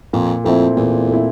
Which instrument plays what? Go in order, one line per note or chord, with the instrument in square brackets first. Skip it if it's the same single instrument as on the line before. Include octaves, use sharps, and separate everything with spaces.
[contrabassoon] F2 [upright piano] A#2
[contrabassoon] F2 [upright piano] A3 C4 E4
[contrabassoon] E2 [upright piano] A#2
[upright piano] A3 C4 E4